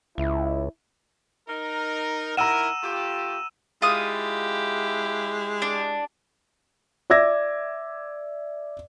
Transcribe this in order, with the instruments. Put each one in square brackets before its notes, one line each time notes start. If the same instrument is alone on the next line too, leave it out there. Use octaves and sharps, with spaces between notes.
[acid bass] C#2 [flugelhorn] E4
[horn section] D#4 A#4
[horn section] D#3 E4 A#4 [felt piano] F#5 A#5 [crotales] E6 D#7 E7
[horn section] A3 F4 G4
[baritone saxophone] G#3 [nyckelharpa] E4 G4 [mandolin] F4 D#6
[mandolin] D4
[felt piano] D5 E5 D6 E6 G#6 A#6